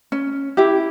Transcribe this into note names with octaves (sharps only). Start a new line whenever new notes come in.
C#4
E4 G4